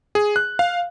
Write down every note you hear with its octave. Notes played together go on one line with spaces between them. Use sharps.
G#4
F#6
F5